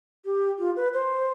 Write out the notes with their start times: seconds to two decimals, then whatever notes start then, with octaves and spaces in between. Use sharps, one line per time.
0.25 G4
0.59 F4
0.76 B4
0.94 C5